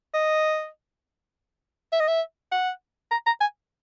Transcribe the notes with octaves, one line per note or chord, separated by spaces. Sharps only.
D#5
E5
D#5
E5
F#5
A#5
A#5
G#5